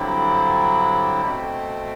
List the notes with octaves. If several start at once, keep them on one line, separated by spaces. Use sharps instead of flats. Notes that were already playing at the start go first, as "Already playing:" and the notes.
Already playing: G2 D3 F#3 C4 E4
B2 A3 C4